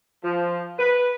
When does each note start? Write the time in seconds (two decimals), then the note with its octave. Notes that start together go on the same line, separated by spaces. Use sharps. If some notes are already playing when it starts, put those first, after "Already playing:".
0.23 F3
0.79 B4